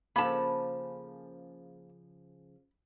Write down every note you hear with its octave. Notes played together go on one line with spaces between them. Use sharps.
C#3 F3 A#3 A4 A5 B5